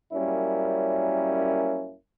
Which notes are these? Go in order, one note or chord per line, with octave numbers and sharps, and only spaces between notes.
F#2 G3 A#3 C#4 E4